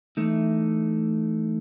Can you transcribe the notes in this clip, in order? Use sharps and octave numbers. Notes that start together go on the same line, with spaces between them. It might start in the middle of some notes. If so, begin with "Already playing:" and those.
E3 A3 D#4